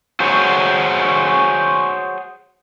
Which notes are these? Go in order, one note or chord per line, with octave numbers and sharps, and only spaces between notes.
F#4 G#4 C5 C#5